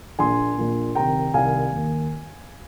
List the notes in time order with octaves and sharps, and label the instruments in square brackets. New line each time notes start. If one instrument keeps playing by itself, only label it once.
[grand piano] A#1 A#2 G#5 C6
A#1 A#2
C2 C3 D#3 G5 A#5
C2 C3 D#3 F5 G#5
D#2 D#3